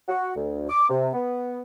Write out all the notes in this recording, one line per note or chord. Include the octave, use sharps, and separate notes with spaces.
F#4
D2
D6
C3
B3